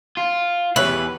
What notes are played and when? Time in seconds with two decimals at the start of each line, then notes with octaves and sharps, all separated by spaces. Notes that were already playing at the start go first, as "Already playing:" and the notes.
0.17 F4
0.76 E2 G#2 G4 B4 C#5 E5